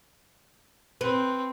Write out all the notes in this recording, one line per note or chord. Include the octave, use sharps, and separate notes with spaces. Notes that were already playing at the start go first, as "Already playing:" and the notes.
C4 B4